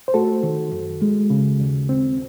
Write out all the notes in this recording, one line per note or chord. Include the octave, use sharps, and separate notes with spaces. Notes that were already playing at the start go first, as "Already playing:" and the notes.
C5
A3 F#4 A4
D#3
F#2
G#3
C#3
D#2
C4